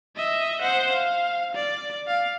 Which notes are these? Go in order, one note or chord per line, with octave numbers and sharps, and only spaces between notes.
D#5 E5
C5 F#5
F5
D5
F5